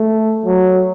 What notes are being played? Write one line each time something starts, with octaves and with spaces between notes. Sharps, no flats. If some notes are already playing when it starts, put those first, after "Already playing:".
Already playing: A3
F#3